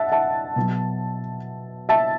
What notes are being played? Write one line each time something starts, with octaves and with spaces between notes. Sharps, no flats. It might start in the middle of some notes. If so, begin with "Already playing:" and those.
Already playing: E5 F#5 A5
E5 A5
B2 F#3
E5 A5